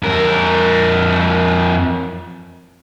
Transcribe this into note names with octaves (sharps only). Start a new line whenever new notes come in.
F2 A#4